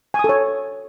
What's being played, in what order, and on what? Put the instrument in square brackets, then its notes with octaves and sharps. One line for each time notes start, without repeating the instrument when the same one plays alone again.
[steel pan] G#5
D#6
A4
C#5